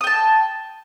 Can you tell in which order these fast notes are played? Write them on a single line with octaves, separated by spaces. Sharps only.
D#6 G5 A5